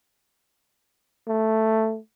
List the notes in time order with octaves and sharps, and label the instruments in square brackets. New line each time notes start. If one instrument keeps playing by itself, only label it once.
[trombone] A3